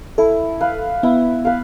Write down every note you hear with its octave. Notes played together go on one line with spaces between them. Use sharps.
E4 A4
B4 F5
B3 E4
B4 F5